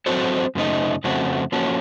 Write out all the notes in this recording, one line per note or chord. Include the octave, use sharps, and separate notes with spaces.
F#3 C4 F#4 A4 C5
F#2 C#3 A3 D#4
F2 C#3 A3 C4 F#4
F3 A#3 C#4 F#4 A4